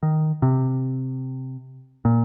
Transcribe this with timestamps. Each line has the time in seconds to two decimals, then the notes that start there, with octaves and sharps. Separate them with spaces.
0.03 D#3
0.42 C3
2.05 A#2